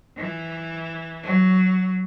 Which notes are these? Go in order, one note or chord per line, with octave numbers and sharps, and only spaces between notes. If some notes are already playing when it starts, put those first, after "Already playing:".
E3
F#3